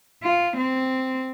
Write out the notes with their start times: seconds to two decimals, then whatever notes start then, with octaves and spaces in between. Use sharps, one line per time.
0.23 F4
0.57 C4